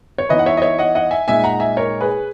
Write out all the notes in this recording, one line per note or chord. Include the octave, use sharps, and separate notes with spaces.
C#5
E3 B3 D#4 B4 D#5
F#5
C#5 E5
D#5
C#5 E5
D#5 F#5
D#5 F#5
E5 G#5
A#2 G#3 D#4 E5 G#5
F#5 A#5
E5 G#5
A#4 C#5
G#4 B4